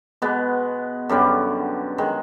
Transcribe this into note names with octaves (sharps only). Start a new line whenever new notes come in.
B2 G#3 B3
F#2 D3 G3 B3
D#3 G#3